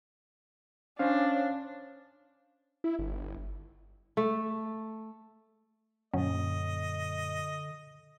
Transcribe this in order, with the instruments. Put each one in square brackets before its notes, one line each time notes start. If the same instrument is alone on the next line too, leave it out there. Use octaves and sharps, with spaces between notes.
[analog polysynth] C#4 [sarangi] D4 [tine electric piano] C5 F5
[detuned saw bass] E4
G1
[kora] A3
[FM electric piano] F#2 A#2 [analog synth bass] D3 [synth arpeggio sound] F#3 C#4 [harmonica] D#5